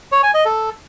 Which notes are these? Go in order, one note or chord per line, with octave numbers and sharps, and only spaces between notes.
C#5
G#5
D#5
A4